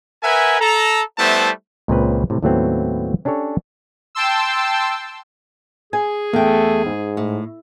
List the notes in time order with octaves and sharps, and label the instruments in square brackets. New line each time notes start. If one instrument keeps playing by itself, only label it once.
[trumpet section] A#4 B4 E5 F#5 G#5
A4 A#5
G3 A3 B3 E4 C5 A5
[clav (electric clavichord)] C#2 A#2 C#3 C4 B4
A2 C3
D#2 A2 F#3 A3 B3 C4
C#4 D4 G4 A4 C#5
[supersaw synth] G5 A5 C6 E6
[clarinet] G#4 [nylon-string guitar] G#5
[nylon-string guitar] E2 G5 [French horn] A3
[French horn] G#2
[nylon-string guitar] A2